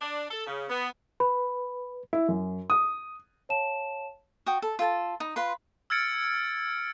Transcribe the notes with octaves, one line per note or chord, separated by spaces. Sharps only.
D4
A4
C#3
B3
B4 B5
E4
F#2
D#6
C#5 F5 A5 E7
F#4 G5 D#6
A4
F4 A4 G#5 A5
D#4
F4 B4 C6
E6 F6 G#6 A6 C#7 D7